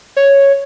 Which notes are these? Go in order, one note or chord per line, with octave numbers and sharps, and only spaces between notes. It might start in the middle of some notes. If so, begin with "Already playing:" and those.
C#5